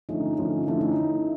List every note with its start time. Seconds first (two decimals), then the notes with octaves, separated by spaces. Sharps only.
0.09 D3 F3 A3 C#4 D#4
0.38 D3 F3 A3 C#4
0.68 D3 F3 A3 C#4 E4
0.81 D#4